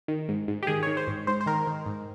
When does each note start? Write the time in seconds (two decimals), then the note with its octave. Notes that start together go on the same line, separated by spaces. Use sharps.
0.08 D#3
0.29 G#2
0.48 G#2
0.63 G4
0.67 D#3 G#4
0.83 D#3 C#5
0.97 C5
1.07 G#2
1.27 G#2 C5
1.41 C5
1.46 D#3 A#4
1.67 D#3
1.86 G#2